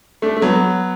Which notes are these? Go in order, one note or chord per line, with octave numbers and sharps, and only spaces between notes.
A3 D4
A3
F#3 B3